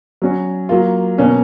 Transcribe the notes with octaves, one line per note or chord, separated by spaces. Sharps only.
F#3 C#4 F#4
F#3 A#3 F4
B2 A#3 C#4